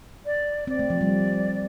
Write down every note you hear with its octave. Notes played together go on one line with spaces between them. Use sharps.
D5
C4 D5
A3
F3
G3